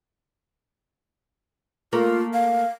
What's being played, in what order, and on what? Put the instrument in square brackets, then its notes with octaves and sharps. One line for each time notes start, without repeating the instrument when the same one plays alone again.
[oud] A3 A#3 A#4 [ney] F4
[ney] F5